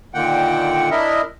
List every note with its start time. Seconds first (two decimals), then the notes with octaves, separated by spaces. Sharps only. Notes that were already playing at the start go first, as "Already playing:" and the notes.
0.14 A#2 D3 D#3 A#3 F#5 G5
0.91 D4 E4 A#4 D#5 E5